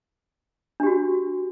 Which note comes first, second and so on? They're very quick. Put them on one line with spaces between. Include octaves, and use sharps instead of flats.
D4 G4 F#4